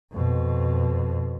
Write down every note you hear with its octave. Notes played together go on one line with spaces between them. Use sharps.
F2 B2